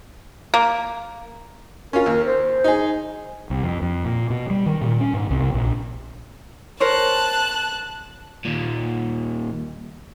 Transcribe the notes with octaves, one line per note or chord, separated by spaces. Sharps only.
A#3
C#4 F4 A#4
D#2
C5
D#4 G#4
C2
F2
F2
A#2
B2
G3
D#3
A#2
C#4
G#2
C2
A#1
A#4 C5 C#5 A5 F#6
D#2 A#2